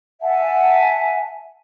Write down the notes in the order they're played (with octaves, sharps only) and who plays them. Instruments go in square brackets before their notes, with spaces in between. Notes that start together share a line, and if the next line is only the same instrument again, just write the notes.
[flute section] E5 F#5 G#5 A5